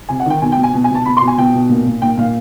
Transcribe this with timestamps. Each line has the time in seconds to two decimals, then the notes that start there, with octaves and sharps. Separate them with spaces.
0.09 C3 G#5
0.20 F#5
0.26 D#3 G5
0.42 B2 G#5
0.52 G5
0.57 B2
0.63 G#5
0.74 B2
0.84 G#5
0.90 B2 A5
1.05 B2 B5
1.17 C6
1.21 B2
1.27 G#5
1.38 B2 G5
1.54 B2
1.69 A#2
1.86 A#2
2.02 A#2 G5
2.18 A#2 F5